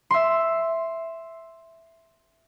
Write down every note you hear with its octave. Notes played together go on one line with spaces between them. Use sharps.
E5 C6